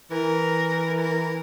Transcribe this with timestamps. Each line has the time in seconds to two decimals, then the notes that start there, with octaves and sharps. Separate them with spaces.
0.11 E3 A#4
1.01 A#4